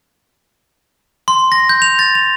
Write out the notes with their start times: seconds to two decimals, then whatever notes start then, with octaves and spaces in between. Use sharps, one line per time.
1.28 C6
1.52 A#6
1.69 G6
1.82 F7
1.99 A6
2.15 F7